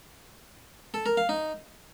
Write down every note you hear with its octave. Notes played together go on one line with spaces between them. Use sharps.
A4
A#4
F5
D#4